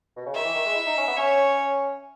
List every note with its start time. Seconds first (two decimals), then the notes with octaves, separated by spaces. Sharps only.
0.16 B2
0.26 C#3
0.35 D#3 E5
0.45 E3
0.55 D#3
0.66 G#3
0.76 E4
0.87 D#4
0.98 C#4
1.08 B3
1.17 C#4 C#5